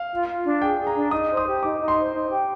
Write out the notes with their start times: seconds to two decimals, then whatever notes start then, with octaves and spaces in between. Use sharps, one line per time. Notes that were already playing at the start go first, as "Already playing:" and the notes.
Already playing: F5
0.11 F4
0.28 F4
0.44 D4
0.61 G#4 G5
0.78 G#4
0.87 A#5
0.95 D4
1.11 D#4 D#6
1.29 C5
1.37 D#6
1.46 G4
1.62 D#4 D6
1.80 D#4
1.88 C6
1.97 C5
2.13 D#4
2.30 G4